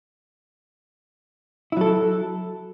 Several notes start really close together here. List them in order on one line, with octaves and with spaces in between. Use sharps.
E4 F#3 A4